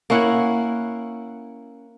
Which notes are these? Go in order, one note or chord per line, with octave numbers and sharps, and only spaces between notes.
A#3 C#4 E4 F#5